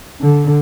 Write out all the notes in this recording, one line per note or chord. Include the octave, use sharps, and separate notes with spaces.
D3